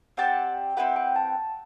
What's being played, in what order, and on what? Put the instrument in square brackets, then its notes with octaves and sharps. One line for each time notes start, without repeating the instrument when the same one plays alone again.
[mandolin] C4 G4 D5 A5 [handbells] F#5
[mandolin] C4 E4 G4 B4 [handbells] F#5
[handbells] G5
A5